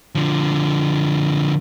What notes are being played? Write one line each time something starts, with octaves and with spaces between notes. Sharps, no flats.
D3 F3